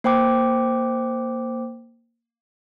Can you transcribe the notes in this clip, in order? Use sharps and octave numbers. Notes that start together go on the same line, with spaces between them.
A#3 C5 G5 D6